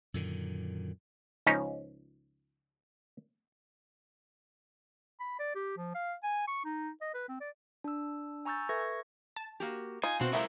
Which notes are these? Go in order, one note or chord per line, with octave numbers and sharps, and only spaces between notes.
F#2 A#2 D3 D#3
C#2 F3 C#4 D#4 C#5
B5
D5
G4
F3
F5
G#5
C#6
D#4
D#5
B4
C4
D5
D4 E6
G#5 A#5 C#6 E6 G6 A6
A4 B4 E5 C#6 G#6 A#6
A5
A#3 F#4 G4
D#4 F4 G#5
B2 C4 F#4
F3 A3 E4 F#4 A#4 E5